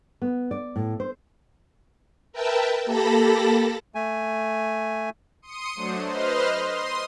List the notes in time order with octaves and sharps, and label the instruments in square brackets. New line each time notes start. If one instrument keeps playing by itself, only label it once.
[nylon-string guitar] B3
D5
A2
C5
[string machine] A#4 B4 E5 G5 A5
A#3 G4 A4 A5 B5 A#6
[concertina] A3 G#5
[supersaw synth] C6 D#6 C#7 D#7
F#3 A3 D4 C5
B4 C5 D#5 C6 F6
C6 D#6